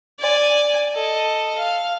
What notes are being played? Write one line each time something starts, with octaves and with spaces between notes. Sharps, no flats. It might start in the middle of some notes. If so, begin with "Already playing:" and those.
D5 G#5
A4 D#5
F5